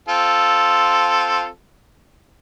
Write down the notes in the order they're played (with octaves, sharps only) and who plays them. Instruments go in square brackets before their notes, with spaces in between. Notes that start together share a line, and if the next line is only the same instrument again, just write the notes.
[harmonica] C4 F4 A4